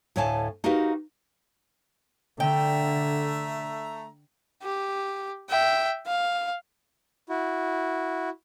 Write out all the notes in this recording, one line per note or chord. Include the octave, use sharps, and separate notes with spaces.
D2 A2 C#5 F5 G#5 A5
D#4 F#4 G4 A#4 B4 F5
D3 A3 E5 G5 A#5
G4
E5 G5
F5
E4 F#4